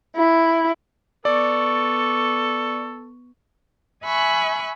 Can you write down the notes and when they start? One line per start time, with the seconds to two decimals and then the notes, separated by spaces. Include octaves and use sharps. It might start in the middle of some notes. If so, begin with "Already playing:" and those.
0.16 E4
1.25 B3 A4 D5 C#6
4.04 E5 G#5 B5 C#6 F#6